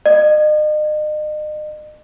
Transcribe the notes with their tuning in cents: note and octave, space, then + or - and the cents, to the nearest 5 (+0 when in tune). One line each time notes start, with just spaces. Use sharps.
D#5 -40